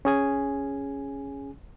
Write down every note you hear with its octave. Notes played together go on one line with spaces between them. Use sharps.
C#4 G#4 G#5